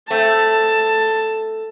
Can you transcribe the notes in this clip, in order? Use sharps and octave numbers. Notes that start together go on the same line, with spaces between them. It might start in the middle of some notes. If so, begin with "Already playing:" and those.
A3 C4 A5